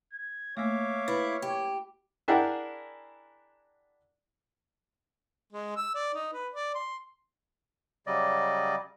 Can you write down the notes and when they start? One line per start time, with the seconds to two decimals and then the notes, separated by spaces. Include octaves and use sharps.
0.13 G#6
0.57 A3 A#3 C#5 E5 F5 D6
1.08 E4 B4
1.42 F#2 G4
2.28 D4 E4 G#4 A#4 F#5 G5
5.53 G#3
5.76 E6
5.95 D5
6.14 D#4
6.33 B4
6.53 D5
6.75 C6
8.07 C#3 F#3 G3 D5 D#5